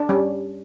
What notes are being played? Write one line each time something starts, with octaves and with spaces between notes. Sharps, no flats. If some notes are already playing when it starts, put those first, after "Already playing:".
Already playing: D4
G3 C#4